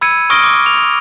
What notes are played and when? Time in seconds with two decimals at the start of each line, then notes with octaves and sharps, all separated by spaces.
0.01 B5 E6 G#6 C#7 D#7
0.30 C#6 D#6 F6 A#6 D7 G7
0.44 D6
0.66 F7